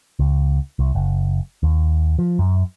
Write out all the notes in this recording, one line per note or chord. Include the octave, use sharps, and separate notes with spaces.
C#2
C2
F#1
D#2
F3
F#2